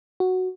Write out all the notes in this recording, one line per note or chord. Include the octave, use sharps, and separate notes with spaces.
F#4